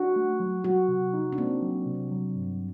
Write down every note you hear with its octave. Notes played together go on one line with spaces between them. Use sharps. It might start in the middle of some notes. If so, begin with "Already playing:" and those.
Already playing: D4 F#4
A3
F#3
F#3 F#4
C3
D#4
D4
A#3 C4
F#3
C3
F#3
G2